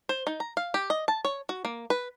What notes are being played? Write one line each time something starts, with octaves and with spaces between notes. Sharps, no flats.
C5
D#4
A#5
F5
G4
D#5
A5
C#5
F#4
A#3
B4